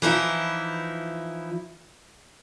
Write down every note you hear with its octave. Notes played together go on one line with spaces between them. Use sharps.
E3 F3 D#4 E4